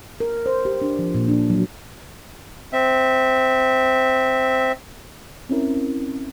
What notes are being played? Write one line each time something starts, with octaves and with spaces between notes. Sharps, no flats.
A#4
C5
G4
D4
F3
A#2
D4
F#3
C4 E5
C4 C#4 E4 A#4